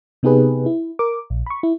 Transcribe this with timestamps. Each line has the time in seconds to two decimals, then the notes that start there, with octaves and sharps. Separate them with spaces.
0.23 C3 B3 D#4 G4 G#4 B4
0.66 E4
0.99 A#4 D6
1.30 A#1
1.46 B5 C#6
1.63 E4